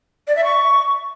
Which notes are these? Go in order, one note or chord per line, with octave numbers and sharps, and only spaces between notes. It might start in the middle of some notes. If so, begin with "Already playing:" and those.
D5
E5
C#6